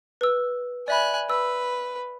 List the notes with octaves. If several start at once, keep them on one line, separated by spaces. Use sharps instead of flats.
B4 E6
D5 E5 G#5 B5 F#6
B4 E6